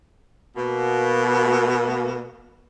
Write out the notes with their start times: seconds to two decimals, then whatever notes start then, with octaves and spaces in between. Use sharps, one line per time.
0.56 B2 A#3